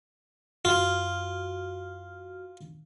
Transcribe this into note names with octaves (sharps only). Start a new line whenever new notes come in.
F#2 F4 F#4 F6